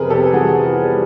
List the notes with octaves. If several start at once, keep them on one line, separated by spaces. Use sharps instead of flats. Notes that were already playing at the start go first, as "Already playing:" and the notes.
Already playing: F2 C3 G#4 A#4 B4
G4 A4
E3 F#4 G#4
G3